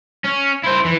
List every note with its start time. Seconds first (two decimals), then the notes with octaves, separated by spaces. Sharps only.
0.24 C#4
0.64 E4 C5
0.85 E3